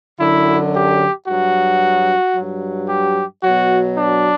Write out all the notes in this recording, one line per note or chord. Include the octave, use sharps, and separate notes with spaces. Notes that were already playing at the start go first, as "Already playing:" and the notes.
F#2 D3 F#3 E4
G4
G2 F#3 F#4
G2 F#3
G4
B2 F#3 F#4
D4